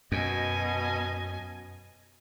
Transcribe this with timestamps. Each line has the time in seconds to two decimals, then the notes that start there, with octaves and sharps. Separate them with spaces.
0.12 F#2 B2 D#5 G#5